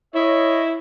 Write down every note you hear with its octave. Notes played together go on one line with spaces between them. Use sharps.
E4 C#5 D#5